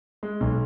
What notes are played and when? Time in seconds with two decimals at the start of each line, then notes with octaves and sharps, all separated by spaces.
0.23 G#3
0.40 B1